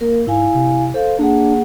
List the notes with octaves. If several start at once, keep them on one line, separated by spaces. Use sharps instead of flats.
A#3 A#4
G#2 E4 F5 G#5
C3
A4 C5 F5
A#3 D4 G#4 F#5